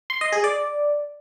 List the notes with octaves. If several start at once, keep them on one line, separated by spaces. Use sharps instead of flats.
C6
D#5
G#4
D5